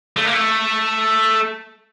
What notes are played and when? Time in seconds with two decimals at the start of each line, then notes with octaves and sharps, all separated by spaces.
0.17 A3
0.24 A#3
0.33 A3